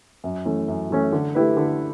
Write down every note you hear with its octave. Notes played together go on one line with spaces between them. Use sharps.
F#2
E3 A3 C#4
F#2
E3 A3 C#4
D3
A3 E4 G4 B4
D3